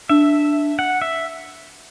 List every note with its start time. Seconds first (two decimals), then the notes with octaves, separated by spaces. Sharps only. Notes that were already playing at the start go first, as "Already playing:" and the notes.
0.09 D4 E5
0.79 F#5
1.02 E5